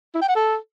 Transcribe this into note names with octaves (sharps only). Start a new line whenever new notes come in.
E4
G5
F#5
A4